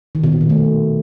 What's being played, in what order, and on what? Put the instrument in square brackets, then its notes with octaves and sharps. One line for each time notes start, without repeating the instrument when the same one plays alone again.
[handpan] D#3
B2
A#2
D#3
A3